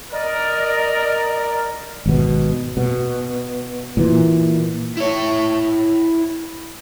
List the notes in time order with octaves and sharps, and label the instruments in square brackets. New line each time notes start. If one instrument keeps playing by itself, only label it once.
[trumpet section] A#4 [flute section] D5 D#5
[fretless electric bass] G#1 B2
B2
A#2 E3
[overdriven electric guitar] E4 C#5